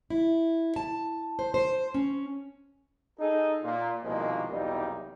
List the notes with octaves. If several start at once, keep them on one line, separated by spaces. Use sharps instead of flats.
E4
A5
C5
C5
C#4
D#4 G#4 A4
A#2
C2 B2 D#3 F3 G#3 A#3
B1 E2 C3 G3 A#3 D#4